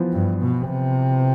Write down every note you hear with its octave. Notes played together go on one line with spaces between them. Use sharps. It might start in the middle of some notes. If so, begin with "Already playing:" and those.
Already playing: E3 F3 B3
G2
B2
C3